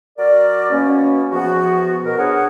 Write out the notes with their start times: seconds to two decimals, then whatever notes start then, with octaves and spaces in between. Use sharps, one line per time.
0.18 F#3 A#4 D5
0.71 B2 A#3 C#4
1.31 E2 F3 B3 F#4
2.04 B2 A#4
2.18 B3 D4 G#4 C#5 F#5